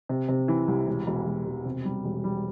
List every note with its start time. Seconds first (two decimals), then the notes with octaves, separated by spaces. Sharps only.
0.09 C3
0.29 C3
0.48 E3
0.68 C2
0.87 E1
1.07 E1
1.26 E1
1.46 E1
1.65 C3
1.85 G3
2.04 E1
2.24 G3